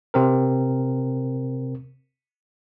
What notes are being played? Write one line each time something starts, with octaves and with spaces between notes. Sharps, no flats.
C3 C4 A#4